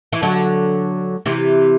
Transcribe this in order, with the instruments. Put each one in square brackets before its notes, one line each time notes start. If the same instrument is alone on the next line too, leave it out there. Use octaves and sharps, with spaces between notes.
[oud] E3
D3 F#3
C3 E3